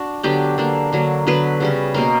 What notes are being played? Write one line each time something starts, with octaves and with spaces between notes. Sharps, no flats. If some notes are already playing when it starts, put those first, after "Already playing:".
Already playing: D4 F#4
D3 F#3 B3 D4 G4
D3 A#3 D4
D3 F#3 A#3
D3 F#3 B3 B4
C#3 G3 C#4
B2 A#3 C#4 A#4